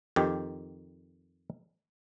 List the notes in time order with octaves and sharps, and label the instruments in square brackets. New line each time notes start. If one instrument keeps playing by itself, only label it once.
[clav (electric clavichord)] F2 D#3 G4